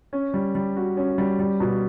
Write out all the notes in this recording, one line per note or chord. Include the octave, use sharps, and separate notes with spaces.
C#4
G3
G3
F#4
C#4
G3
G3
B2